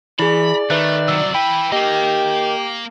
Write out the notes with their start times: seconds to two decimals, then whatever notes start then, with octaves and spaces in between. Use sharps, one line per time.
0.19 E3 E4 G#4 D5 B5
0.70 D#3 A3 B4 E5 F#6
1.08 C2 F#3 E6
1.35 E3 B4 G5 B5
1.72 A#3 G4 A#4 D#5